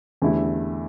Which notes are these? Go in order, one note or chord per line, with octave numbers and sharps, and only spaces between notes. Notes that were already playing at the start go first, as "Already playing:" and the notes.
E2 D3 A3 E4 G4